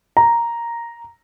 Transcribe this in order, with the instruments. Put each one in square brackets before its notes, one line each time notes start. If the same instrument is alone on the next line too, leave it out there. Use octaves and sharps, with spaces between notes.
[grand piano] A#5